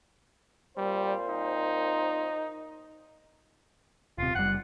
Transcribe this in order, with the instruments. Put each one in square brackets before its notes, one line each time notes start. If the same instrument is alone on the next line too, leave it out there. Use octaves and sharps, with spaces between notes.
[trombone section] A#2 C4 C5 [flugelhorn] G3
[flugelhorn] D#4
[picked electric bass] D#1 C3 [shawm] F4
[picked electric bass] F#1 G3 [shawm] F#5